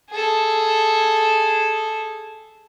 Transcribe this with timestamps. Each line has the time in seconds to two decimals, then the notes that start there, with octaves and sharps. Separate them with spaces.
0.11 G#4 A4